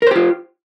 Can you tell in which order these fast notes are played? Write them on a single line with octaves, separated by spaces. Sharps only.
A#4 C5 G4 F4